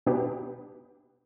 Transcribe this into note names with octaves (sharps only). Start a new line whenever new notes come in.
B2 B3 D4 G4